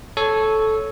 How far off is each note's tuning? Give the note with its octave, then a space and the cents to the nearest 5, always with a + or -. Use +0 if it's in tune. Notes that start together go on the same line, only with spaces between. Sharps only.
A4 -10 C#5 +0